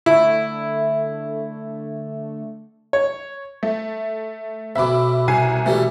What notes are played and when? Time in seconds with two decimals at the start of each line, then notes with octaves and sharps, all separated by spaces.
0.06 D3 A3 E4
2.93 C#5
3.63 A3
4.76 B1 B2 E5 B5 D6
5.28 C2 G#5 C7
5.66 B2 E3 G3 A3